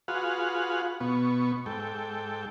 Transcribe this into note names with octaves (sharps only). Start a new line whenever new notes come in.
F4 F#4 G#4 B4 F5 F#5
B2 B3 C#6
G#2 A4 G5